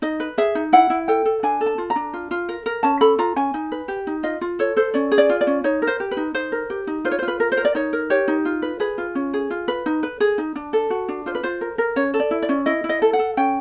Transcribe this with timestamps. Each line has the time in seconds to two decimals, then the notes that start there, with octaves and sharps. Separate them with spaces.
0.02 D#4 D#5
0.20 B4
0.38 G#4 E5
0.55 D#4
0.73 E4 F#5
0.90 E4
1.08 A4 G5
1.25 A4
1.43 D4 G#5
1.61 A4
1.66 A5
1.78 F4
1.90 A#5
1.96 D4
2.13 F4
2.31 F4
2.49 A#4
2.66 A#4
2.83 C#4 A5
3.01 A4 B5
3.19 F4 A#5
3.36 C#4 G#5
3.54 D#4
3.72 B4
3.88 G4
4.07 D#4
4.23 F4 D#5
4.41 F4
4.59 A4 C#5
4.76 A4 C5
4.94 C#4 D5
5.12 G#4
5.18 D5
5.29 F4
5.41 D5
5.47 C#4
5.64 D#4 C#5
5.82 A#4
5.87 C5
6.00 G4
6.11 B4
6.17 D#4
6.35 D#4 C5
6.52 A#4
6.70 G4
6.87 D#4
7.05 F4 C5
7.11 C#5
7.19 C5
7.22 F4
7.28 B4
7.40 A#4
7.52 C5
7.57 A#4
7.65 D5
7.75 D#4 C#5
7.93 A#4
8.10 G4 C#5
8.28 D#4
8.45 F4
8.62 B4
8.80 G#4 B4
8.98 F4
9.15 C#4
9.34 G#4
9.50 F4
9.68 B4
9.86 D#4
10.03 B4
10.20 G#4
10.38 D#4
10.56 D4
10.73 A4
10.90 F#4
11.09 D4
11.26 F4 C5
11.35 B4
11.43 F4 C5
11.61 A#4
11.78 A#4
11.96 C#4 C#5
12.14 A4
12.20 D5
12.31 E4
12.42 D5
12.49 C#4
12.66 E4 D#5
12.84 E4
12.89 D#5
13.02 A4
13.13 F#5
13.19 A4
13.37 C#4 G5